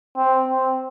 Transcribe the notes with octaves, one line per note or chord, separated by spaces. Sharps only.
C4
C4